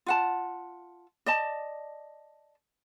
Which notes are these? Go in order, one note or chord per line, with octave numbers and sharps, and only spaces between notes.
F4 F#5 A5
D5 D#5 A5